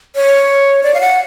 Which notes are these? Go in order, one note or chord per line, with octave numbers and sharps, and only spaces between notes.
C#5
D5
F5
F#5